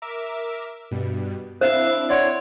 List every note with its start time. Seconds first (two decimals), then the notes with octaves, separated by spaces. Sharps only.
0.02 A#4 E5 D6
0.91 G2 B2 G3
1.61 C4 D4 E4 C5 E5 F5 E6
2.09 C#5 D5 F#5 C6